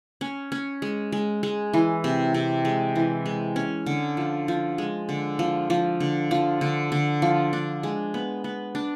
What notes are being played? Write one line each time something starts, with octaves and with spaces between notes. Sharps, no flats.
C#4
C#4
G#3
G#3
G#3
E3
C3
C3
G#3
E3
G#3
C#4
D3
F3
F3
G#3
D3
F3
F3
D3
F3
D3
D3
F3
D4
G#3
B3
B3
D4